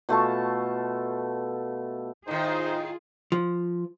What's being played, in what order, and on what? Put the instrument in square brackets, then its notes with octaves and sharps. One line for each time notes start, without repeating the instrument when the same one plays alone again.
[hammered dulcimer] B2 A3 F4 A5
[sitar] A2 D#3 [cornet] D#4 [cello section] F4 G#4 [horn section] C5
[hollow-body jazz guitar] F3